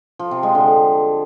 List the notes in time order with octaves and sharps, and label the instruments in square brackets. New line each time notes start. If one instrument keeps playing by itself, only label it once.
[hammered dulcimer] F3
C3
G#3
D3